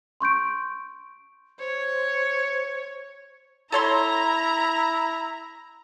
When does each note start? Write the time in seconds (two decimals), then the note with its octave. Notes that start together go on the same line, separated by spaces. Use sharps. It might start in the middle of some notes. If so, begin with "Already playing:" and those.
0.20 C6 C#6 G6 D7
1.59 C5 C#5
3.72 E4 A4 C#5 A#5 C6